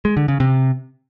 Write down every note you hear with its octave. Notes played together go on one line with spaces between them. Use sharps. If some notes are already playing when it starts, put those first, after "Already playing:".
G#3
D3
C#3
C3